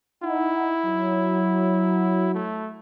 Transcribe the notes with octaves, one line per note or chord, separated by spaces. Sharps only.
D#4 E4 F#5
F#3
A3